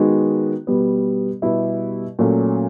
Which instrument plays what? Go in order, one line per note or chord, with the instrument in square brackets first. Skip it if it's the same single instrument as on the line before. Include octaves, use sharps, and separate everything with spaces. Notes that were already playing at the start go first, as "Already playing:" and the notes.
Already playing: [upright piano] D#3 G#3 B3 D#4 F#4
B2 G3 B3
B2 G3 B3 E4 G4
A#2 F#3 A3 C#4